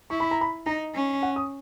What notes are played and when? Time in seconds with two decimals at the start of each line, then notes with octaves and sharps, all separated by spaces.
0.10 E4 C#6
0.20 B5
0.31 A#5
0.41 B5
0.66 D#4 A#5
0.95 C#4
1.23 F#5
1.36 D#6